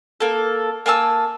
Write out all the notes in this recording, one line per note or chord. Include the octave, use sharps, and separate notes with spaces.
A#3 A4
A#3 G#5 A5 E6